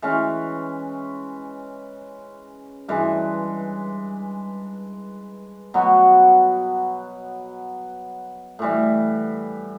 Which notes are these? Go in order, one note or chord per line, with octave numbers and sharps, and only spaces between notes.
E3 G#3 C#4
G2 E3 G#3
B2 F#3 B3
A2 E3 G3